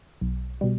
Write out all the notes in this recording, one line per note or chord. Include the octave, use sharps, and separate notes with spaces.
B1
B2 G3